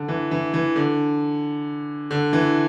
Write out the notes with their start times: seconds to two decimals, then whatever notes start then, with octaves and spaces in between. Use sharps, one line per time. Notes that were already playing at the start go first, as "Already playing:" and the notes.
Already playing: D3
0.08 E3
0.31 E3
0.53 E3
0.76 D3
2.11 D3
2.33 E3